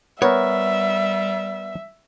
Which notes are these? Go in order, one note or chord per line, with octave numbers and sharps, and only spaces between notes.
G3 B3 A#4 C#5 E5